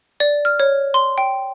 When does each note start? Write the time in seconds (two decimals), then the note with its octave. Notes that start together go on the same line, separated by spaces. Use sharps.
0.20 D5
0.45 F6
0.60 C#5
0.94 C6
1.18 G5